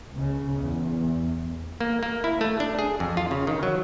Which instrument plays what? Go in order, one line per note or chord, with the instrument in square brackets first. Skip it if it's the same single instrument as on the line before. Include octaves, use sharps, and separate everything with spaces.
[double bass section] C#2 C#3
E2
[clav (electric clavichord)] A#3
A#3
E4
A3
D4
G#4
F2
F4
C#3
D#3
F#3